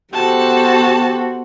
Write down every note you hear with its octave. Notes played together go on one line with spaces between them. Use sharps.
B3 F#4 G4 A4 C5 A5